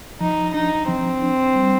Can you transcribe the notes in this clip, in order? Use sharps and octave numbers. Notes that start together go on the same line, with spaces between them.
F3 D#4
D4 D#4
F3 C4
D4
G3